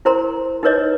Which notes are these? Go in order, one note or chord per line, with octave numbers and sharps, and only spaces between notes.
E4 A#4 C5 A#5 C6
D#4 A#4 B4 C#5 D#5